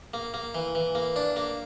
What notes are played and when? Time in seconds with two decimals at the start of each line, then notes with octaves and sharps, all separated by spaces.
0.14 A#3
0.34 A#3
0.55 E3
0.75 E3
0.95 A#3
1.16 D4
1.36 A#3